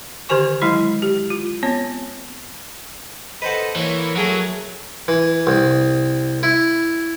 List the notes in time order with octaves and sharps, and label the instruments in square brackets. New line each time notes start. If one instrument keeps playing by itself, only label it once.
[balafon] D3 D#3 G4 C5 G#5 C#6
F#3 G#3 E4 B5
G4
F4
B3 C4 C#5
[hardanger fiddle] A4 D#5 [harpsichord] B4 C5 F#5
[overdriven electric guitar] E3 [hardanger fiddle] A#3 C#5
[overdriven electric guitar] F#3 [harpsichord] A3 G#4 A#4
[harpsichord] E3
C2
E4